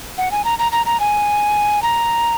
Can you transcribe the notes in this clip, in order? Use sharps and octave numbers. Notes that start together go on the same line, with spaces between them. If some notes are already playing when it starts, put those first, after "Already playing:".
F#5
G#5
A#5
A#5
A#5
A#5
G#5
A#5